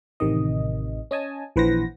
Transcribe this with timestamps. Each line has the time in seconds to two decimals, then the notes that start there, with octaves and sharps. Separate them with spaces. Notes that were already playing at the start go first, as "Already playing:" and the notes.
0.20 A1 C3 D#3 D#5
1.11 C#4 D#5 G#5 A5
1.56 A#1 E3 B4 C5 F#5 A#6